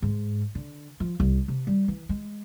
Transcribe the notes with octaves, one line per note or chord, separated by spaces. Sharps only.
G#2
D3
F3
C2
C3
G3
E3
G#3